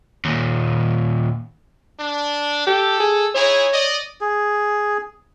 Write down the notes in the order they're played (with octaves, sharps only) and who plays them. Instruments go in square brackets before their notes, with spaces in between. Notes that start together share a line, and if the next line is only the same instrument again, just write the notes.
[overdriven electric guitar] D#2 A#2
[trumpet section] D4
[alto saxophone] G4 [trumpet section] A4
[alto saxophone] G#4
[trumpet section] D#4 E4 G#4 [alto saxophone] C#5
[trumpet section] D5 D#5
[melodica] G#4